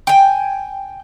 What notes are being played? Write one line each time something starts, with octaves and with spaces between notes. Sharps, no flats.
G5 G#5